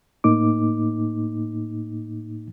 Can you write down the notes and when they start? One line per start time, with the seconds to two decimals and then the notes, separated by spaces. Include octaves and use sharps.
0.24 A2 A#3 D#4 D6